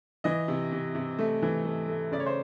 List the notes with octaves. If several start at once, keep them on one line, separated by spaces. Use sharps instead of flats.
E3 D#5
C3
C3
C3
A3
E3
A3
A3
C#3 D5
C#5
C5